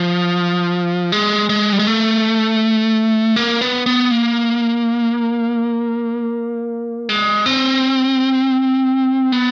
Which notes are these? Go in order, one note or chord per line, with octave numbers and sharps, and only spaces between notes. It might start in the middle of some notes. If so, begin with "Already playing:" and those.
Already playing: F3
G#3
G#3
G3
G#3
A3
A#3
B3
B3
A#3
G#3
C4
B3